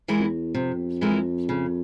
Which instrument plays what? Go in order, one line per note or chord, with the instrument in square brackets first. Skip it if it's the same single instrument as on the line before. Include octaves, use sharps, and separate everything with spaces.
[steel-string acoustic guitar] E3 G#3 E4 A#4
[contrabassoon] F2
E2
[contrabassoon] F2 [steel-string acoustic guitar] C3
[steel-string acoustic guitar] E3 G#3 E4 A#4
C#3